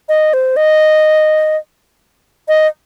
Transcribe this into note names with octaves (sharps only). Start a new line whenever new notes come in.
D#5
C5
D#5
D#5